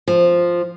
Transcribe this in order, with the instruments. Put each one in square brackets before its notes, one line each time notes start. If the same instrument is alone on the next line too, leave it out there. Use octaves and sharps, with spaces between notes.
[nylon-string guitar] F3